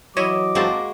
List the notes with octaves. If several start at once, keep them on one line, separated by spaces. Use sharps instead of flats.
E3 F#3 E4 C#5 D#5 D6 E7
G1 G#3 A#3 C4 F#4 A5